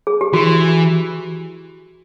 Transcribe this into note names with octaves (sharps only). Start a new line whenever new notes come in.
G#4
G4
E3 F#4